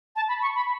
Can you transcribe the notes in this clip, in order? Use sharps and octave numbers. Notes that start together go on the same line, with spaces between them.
A5
B5
C#6
B5